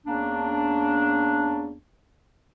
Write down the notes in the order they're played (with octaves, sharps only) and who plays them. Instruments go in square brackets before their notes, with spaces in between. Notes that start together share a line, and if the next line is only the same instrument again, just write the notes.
[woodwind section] E2 A#3 C#4 D4